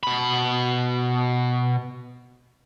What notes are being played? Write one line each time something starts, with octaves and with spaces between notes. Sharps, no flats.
B2 B5